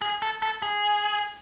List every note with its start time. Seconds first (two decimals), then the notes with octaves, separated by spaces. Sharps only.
0.02 G#4
0.22 A4
0.42 A4
0.62 G#4